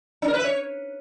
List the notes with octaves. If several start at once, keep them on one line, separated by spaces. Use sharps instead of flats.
D4
A#4
B4
E5
C#5